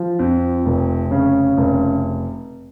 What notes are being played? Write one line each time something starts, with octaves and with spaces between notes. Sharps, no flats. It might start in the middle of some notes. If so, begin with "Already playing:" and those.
Already playing: F3
F2
F1
C#3
F1